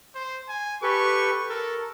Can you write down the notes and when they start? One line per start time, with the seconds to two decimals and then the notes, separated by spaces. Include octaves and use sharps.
0.15 C5
0.48 G#5
0.83 G4 A4 B4 C#6
1.50 A4 A#4